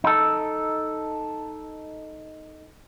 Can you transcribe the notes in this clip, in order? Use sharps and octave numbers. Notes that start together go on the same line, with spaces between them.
D#4 A4